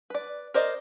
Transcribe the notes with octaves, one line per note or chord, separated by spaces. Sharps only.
B4 D5
A#4 C5 D5 D#5